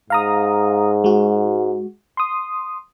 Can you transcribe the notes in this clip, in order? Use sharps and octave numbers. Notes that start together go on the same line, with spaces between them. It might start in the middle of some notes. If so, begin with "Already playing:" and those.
G#2 F5 A#5 D#6
G#3 F#4
C6 D#6